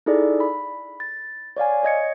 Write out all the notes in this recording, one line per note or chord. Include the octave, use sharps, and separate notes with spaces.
D#4 E4 G#4 A4 D5
B5
A6
C#5 D5 F5 G#5
C#5 D#5 G#6 C#7